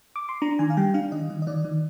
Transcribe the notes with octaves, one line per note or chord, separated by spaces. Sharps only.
D6
C6
D4 A#5
D#3 G#5
F5
G3 G5
D4 F5
D#3 D#5
D#3
D#5
D#3 D5
D#3